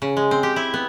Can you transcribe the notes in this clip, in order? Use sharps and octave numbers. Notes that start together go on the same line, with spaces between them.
C#3
G#3
C4
G4
E4
B3